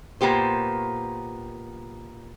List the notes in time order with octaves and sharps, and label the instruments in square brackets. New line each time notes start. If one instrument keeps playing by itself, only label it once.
[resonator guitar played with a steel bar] A#2 A#3 B3 G4 C5